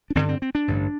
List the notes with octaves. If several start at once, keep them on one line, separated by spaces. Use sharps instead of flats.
D4
A1 G2 D3 C4
C4
C4
D4
A1 G2 D3